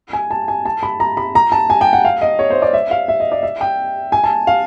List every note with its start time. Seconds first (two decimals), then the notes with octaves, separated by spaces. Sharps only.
0.13 G#5
0.31 A5
0.48 G#5
0.65 A5
0.83 B5
1.00 A#5
1.17 B5
1.35 A#5
1.52 A5
1.70 G#5
1.81 G5
1.93 F#5
2.05 F5
2.21 D#5
2.39 C#5
2.50 C5
2.62 D5
2.73 E5
2.91 F5
3.08 E5
3.20 D#5
3.32 D5
3.43 E5
3.61 G5
4.12 G#5
4.24 A5
4.47 F5